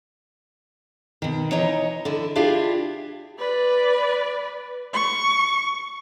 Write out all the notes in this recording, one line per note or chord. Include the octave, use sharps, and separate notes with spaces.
B2 D#3
E3 D#4 C#5 D#5 A#5
D3 E4
D4 E4 F4 G4 G#4
B4 D5
C#6